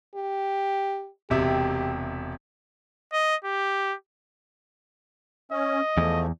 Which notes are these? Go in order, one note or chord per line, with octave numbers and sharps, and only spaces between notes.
G4
E1 C3 G4 E5
D#5
G4
C#4 D#5
E2 F3 A3